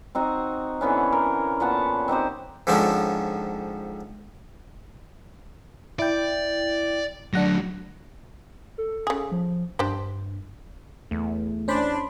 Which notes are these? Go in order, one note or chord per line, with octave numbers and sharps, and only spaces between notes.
C4 D#4 F#4
D3 E3 B3 C#4
A#4
A#2 B3 F#5 A5
C4 D#4 G4 C5
F2 G#2 D3 F3 C#4
E4 D5 G5
F#3 A3 D4 F#5 A#6
A4
C#3 G#4
F3
G2 D4 G4 C5
E2 A3
C#4 D4 C5 B5